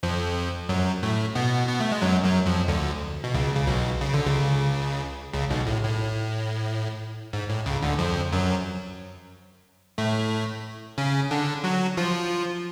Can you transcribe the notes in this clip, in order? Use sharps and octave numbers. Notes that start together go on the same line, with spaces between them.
F2 F3
F#2 F#3
A2 A3
B2 B3
B3
A3
G#3
F#2 F#3
F#2 F#3
F2 F3
D2 D3
B2
C#2 C#3
C#3
B1 B2
C#3
D3
C#2 C#3
C#2 C#3
B1 B2
A2
A2
G#2
A2
C#2 C#3
D2 D3
F2 F3
F#2 F#3
A2 A3
C#3 C#4
D3 D4
F#3 F#4
F3 F4